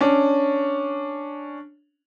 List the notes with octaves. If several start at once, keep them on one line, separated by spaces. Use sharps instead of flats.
C#4 D4